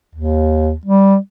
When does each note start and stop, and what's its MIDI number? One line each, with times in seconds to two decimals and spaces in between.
0.15 0.74 39
0.85 1.17 55